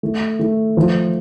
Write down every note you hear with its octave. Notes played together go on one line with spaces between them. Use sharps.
A3
A3
F3